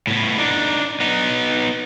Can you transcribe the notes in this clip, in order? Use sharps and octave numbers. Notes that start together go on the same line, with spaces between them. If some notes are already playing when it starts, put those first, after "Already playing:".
A2 B3
D4 D#4
B3 D#4